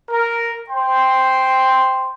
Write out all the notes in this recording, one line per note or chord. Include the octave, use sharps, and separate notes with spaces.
A#4
C5 G5 C6